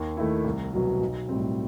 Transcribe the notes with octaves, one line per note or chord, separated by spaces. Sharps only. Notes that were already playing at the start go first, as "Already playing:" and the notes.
Already playing: D#2
D#3 A3 E4
C2
B2 F#3
B1
A2 G3 C4